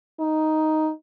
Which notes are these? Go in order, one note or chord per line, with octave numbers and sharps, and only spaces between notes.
D#4